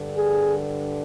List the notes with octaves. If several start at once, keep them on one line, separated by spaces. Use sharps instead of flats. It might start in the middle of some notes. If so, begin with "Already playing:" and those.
Already playing: G2 D3
G#4